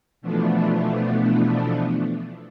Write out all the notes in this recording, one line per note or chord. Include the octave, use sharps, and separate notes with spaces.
B2 E3 F3 A3 B3 D4